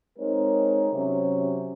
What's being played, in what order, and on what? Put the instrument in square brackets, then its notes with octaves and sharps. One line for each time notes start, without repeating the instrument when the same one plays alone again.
[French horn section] G#3 C4 D#4 A#4 C#5
C3 F#3 C#4